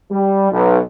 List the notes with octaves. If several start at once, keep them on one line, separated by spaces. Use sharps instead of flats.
G3
B1